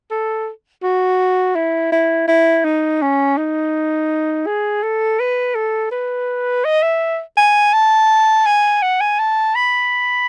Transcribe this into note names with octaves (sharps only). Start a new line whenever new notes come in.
A4
F#4
E4
E4
E4
D#4
C#4
D#4
G#4
A4
B4
A4
B4
D#5
E5
G#5
A5
G#5
F#5
G#5
A5
B5